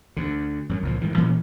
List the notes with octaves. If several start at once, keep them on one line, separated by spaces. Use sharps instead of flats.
D2 D3
F#2 F3 F#3
C#2 A#2 F3
G#2 D#3 E3
A#2 E3 A#3 C#4